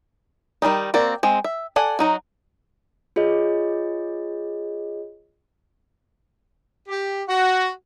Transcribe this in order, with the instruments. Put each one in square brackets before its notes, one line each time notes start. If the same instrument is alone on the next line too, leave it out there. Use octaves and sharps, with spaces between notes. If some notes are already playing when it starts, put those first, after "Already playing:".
[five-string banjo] D#3 G3 G#3 D#4
A#3 C4 F#4 D5
G#3 C4
E5
A4 D5 F#5 G#5
F#3 D#4 F#4
[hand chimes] F4 G#4 C#5 D#5
[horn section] G4
F#4